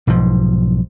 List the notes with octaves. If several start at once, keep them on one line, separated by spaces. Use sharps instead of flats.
B1 G#2 F3